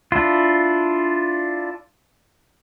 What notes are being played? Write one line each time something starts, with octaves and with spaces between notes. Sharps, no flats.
D4 E4 F4